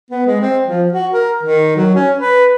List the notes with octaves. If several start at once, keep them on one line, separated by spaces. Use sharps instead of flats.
B3
G#3
C4
F3
F#4
A#4
D#3
F#3
C#4
B4